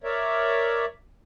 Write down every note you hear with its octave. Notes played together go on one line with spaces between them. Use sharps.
A#4 C#5 D5 E5